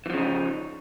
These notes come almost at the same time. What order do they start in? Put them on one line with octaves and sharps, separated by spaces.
E3 F3 C#3 D#4